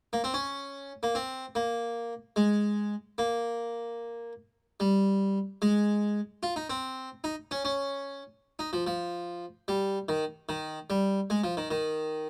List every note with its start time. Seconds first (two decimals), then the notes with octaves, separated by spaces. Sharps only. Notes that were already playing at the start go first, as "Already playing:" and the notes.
0.13 A#3
0.24 C4
0.34 C#4
1.03 A#3
1.15 C4
1.55 A#3
2.36 G#3
3.18 A#3
4.80 G3
5.62 G#3
6.43 F4
6.56 D#4
6.70 C4
7.24 D#4
7.51 C#4
7.65 C#4
8.59 D#4
8.73 F3
8.87 F3
9.68 G3
10.09 D#3
10.49 D#3
10.90 G3
11.30 G#3
11.44 F3
11.57 D#3
11.71 D#3